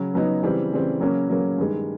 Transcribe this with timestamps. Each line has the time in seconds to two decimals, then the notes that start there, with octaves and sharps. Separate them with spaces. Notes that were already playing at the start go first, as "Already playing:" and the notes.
Already playing: C#3 F#3
0.14 C#3 F#3 B3 D#4
0.43 C#3 E3 G3 C4
0.72 C#3 E3 G3 C4
1.00 C#3 F#3 A#3 C#4
1.29 C#3 F#3 A#3 C#4
1.58 G2 D#3 G#3